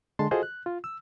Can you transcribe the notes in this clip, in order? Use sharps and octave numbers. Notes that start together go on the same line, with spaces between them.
D3 G#3 A5 C6
F4 F#4 G#4 A4 C5 D#5
F#6
F4
E6